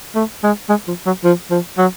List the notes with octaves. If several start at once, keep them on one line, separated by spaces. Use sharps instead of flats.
A3
G#3
G#3
F3
F#3
F3
F3
F#3